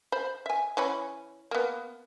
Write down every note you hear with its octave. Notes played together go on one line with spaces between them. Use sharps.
C5 B5
E5 G#5
E3 C#4 B5
A#3 B3